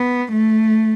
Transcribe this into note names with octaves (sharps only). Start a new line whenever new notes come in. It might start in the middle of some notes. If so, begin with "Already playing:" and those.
Already playing: B3
A3